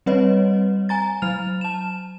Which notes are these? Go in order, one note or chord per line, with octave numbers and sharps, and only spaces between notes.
G3 C4 B4 C#5 D#5
G#5 A#5 A6
F#3 F6 F7
A5 E7